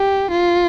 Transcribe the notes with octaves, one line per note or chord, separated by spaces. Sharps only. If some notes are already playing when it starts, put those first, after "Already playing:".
Already playing: G4
F4